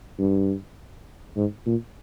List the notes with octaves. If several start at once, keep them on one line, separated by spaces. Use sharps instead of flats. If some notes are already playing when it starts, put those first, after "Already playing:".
G2
G#2
A#2